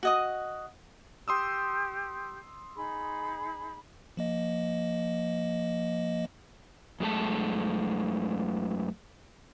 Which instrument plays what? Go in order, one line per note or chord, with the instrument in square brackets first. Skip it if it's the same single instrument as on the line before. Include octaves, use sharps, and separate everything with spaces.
[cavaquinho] F#4 D#5 D#6
[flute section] G4 [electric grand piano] C6 D#6 E6
[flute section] D#4 G#4 B5
[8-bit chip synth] F3 A#3 D#5
[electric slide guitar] F#2 G#3 A3 A5